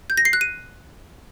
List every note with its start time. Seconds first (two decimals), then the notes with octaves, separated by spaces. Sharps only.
0.10 G6
0.17 A#6
0.25 C7
0.33 F#6
0.41 D#7